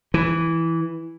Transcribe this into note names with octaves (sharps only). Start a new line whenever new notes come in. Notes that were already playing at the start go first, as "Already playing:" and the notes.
E3